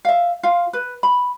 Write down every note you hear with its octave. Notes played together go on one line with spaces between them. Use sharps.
E5 F5
F4 F5
B4
B5